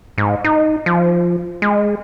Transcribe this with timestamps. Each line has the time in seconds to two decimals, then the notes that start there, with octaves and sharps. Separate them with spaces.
0.18 G#2
0.44 D#4
0.86 F3
1.62 G#3